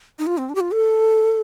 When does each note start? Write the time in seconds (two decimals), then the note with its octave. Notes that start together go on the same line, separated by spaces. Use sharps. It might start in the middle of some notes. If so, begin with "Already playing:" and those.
0.19 D#4
0.27 F4
0.38 C4
0.49 D4
0.55 G4
0.60 F4
0.72 A4